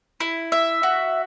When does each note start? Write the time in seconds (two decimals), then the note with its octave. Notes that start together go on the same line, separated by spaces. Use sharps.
0.20 E4
0.52 E5
0.83 F#4